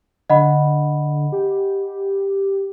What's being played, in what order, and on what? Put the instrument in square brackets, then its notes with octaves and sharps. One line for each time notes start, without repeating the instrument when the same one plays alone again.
[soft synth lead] D3 [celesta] D#5 F#5 B5
[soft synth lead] G4